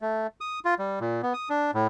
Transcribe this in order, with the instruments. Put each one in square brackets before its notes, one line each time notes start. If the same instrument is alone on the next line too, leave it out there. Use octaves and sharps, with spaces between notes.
[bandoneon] A3
D#6
F4
G3
A#2
B3
D#6
D4
A2